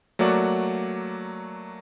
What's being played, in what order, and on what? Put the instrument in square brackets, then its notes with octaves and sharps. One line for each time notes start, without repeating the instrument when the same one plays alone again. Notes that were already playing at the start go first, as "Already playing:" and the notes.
[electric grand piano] F#3 A3 A#3 F#4 D5